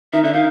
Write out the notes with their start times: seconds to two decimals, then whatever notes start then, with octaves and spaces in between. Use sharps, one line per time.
0.13 D#3 E5
0.24 D3 E5
0.33 D#3 F5